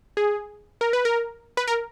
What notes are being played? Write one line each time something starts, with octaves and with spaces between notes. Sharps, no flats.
G#4
A#4
B4
A#4
B4
A#4